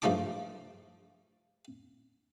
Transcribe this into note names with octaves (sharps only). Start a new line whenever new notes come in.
G2 F3 A3 D#4 A5 D6